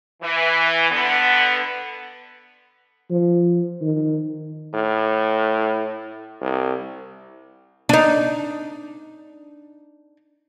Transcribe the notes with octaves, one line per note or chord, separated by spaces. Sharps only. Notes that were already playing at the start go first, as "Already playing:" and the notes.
E3
D3 B3
F3
D#3
A2
C2
D4 D#4